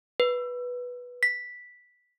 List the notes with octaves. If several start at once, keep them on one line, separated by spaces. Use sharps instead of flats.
B4
B6